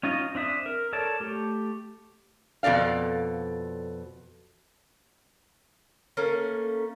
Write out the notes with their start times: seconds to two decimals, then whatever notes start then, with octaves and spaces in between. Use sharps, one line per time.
0.03 C#4 D#4 F4 D#5
0.35 C4 D4 E5 D#6
0.66 A#4
0.93 A4 A#4 C#5 D5 A5
1.20 A3 G4
2.63 F2 B2 A4 D5 F5
6.17 A3 A#3 C#4